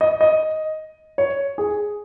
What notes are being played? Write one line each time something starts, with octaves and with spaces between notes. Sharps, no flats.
D#5
D#5
C#5
G#4